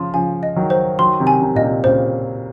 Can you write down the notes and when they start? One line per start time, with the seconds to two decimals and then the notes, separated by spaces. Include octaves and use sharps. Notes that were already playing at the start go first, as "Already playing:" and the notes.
Already playing: C#3 F3 C6
0.14 C#3 F3 G#5
0.43 D#5
0.56 D#3 F#3
0.70 C5
0.99 D#3 F#3 C6
1.20 C3 D#3
1.27 G#5
1.42 C3 D#3
1.55 A#2 D#5
1.63 C3
1.84 A#2 C#3 C5